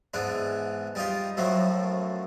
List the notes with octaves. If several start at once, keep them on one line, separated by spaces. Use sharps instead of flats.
G#2 E3 B3 D4
G3 D#4 F4 G4
F#2 A2 F3 F#3 A3